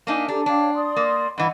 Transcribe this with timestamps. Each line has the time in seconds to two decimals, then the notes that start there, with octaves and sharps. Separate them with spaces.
0.07 A#3 D4 D#4 E5 F5 G#5
0.28 D4 G4 A4 A#5
0.46 D4 C#5 F5 G5
0.74 D5 C6 D#6
0.96 A#3
1.38 G2 E3 D#5 F#5